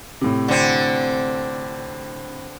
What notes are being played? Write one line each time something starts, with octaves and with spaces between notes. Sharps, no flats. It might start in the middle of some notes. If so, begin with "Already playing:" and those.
A2 C3
D3 C4